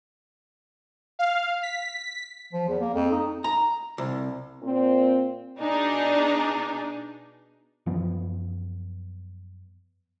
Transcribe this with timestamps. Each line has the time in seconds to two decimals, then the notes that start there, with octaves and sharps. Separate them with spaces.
1.19 F5
1.63 B6
2.53 F3
2.68 E2
2.81 A#3
2.94 F2
3.11 D#4
3.44 A#5
3.98 C2
4.63 A#2 C4
5.59 B2 D4 D#4 G#4
7.86 F#2 F3 B3